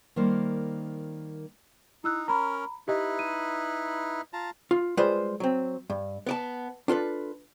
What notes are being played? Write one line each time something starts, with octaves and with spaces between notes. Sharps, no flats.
D#3 G3 A#3 C5
D#4 E4 E6 F#6
C#4 A#4 A#5 B5
D#4 E4 G4 B4 D#5 E5
D#7
F4 A5 A#5
F4
G3 G#3 F4 B4 C5
F#3 C4
G2
B3 D5 A5
D4 F4 A4 B4